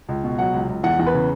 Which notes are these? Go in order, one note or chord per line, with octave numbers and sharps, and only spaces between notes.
C#2
B2
F#3 F#5
C#2
C#2
E2 F#5
E2
B4
C#3